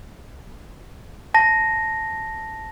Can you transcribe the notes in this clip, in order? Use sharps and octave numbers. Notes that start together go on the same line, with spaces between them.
A5 A#6